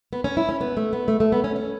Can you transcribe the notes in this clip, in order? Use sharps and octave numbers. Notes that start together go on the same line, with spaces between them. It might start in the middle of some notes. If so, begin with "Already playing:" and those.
B3
C#4
E4
C#4
B3
A3
B3
A3
A3
B3
C#4
C#4